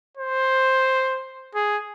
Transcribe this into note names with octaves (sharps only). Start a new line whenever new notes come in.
C5
G#4